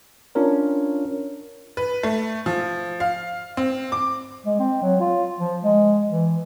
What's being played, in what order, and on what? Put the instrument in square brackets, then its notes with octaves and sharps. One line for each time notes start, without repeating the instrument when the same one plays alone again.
[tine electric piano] C#4 D4 F4 A#4 C#5
[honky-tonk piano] B4
A3
F3
F5
C4
D6
[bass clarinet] G#3
C4
F#3
F4
F3
G#3
E3